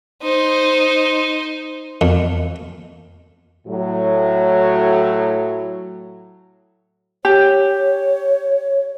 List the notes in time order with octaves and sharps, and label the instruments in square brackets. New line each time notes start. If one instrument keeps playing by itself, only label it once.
[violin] D#4 C5
[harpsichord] F2
[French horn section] A2 F#3
[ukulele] G4 [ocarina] C#5